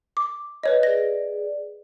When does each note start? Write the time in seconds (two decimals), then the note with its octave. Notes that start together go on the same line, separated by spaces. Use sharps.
0.17 D6
0.63 B4 C#5 D#5
0.83 G#4 D5 A#6